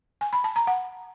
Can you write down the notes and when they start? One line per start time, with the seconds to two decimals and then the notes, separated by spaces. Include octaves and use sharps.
0.21 G#5
0.33 B5
0.44 A5
0.56 A#5
0.67 F#5